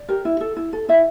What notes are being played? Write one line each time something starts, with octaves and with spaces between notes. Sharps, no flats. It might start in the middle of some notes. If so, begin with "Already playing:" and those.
Already playing: D5
G4 A#4
E4
A4
E4
A4
E4 E5